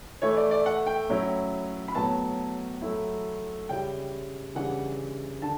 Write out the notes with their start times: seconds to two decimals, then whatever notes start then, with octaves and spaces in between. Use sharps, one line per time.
0.22 E3 A3 E4 C#5
0.37 D5
0.51 D5
0.66 F#5
0.86 G5
1.09 A2 F#3 C#4 E4
1.88 B5
1.95 A2 F#3 B3 A5
2.82 F#3 A3 E4
3.69 C#3 G3 C#4 E4 G5
4.55 C#3 E3 G3 D4 F#5
5.42 D3 A5